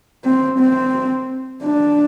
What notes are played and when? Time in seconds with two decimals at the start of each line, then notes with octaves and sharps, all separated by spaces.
0.24 C4
0.59 C4
1.64 D4